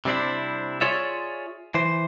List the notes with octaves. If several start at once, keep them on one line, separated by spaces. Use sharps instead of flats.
C3 G3 C4 D4 E4
F4 G#4 C#5 D5 E5
E3 C5